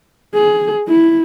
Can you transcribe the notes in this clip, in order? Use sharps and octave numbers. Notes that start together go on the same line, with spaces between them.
G#4
E4